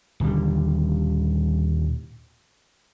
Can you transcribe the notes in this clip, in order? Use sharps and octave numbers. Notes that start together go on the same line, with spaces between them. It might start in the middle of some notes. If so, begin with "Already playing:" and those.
D#1 D3 G3